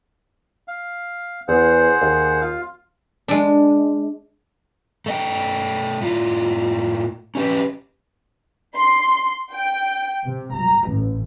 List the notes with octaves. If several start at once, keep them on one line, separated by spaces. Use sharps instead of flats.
F5
E2 G#4 C5 F#5
D#2
F4 F5
G#3 D4
A3 D#5 G5
A2 F4
C#4 G4 B4
C6
G5
C3
A#5
A1